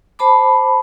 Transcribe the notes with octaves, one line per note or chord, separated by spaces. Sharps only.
C5 A5 B5 D6